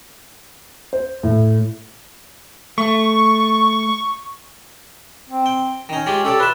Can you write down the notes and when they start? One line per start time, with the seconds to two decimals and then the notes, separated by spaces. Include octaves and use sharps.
0.93 C5
1.23 A2
2.78 A3 C#6
5.29 C4
5.46 G5
5.89 D#3 C#4 D#4
6.06 G#3 F4 G4
6.25 G4 A4 C#5 D5
6.39 F4 B4 E5